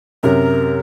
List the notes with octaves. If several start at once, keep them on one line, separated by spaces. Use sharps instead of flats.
F#2 C3 A#4